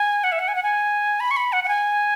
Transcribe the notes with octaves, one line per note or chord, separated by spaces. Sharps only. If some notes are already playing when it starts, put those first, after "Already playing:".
Already playing: G#5
F#5
E5
F#5
G#5
F#5
G#5
B5
C#6
B5
F#5
F#5
G#5